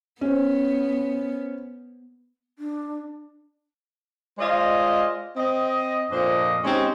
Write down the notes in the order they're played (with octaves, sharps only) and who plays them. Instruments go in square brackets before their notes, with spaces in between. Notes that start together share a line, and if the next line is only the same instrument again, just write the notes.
[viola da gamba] B3 [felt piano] C#4 C5
[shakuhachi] D4
[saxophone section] G#3 F4 C5 D5 D#5
C4 D#5
F2 A#2 D4 C5 D#5
G#3 C4 C#4 D#4 G4